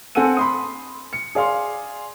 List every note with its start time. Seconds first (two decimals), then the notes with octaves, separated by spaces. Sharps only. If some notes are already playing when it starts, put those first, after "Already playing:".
0.15 C4 A4 F#5 G#5 E6 D#7
0.37 B5 C6 D#6
1.13 C#7
1.35 G#4 D5 F5 C6